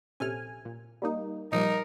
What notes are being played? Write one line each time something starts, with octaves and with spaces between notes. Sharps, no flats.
A#1 C3 C#4 A4 G#5 F6
A#2
G3 A#3 D#4
A#2 F3 G3 D#4 A#4